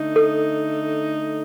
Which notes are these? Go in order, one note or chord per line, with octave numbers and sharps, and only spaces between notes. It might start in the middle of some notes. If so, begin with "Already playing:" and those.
Already playing: D3 A3 D#4
A4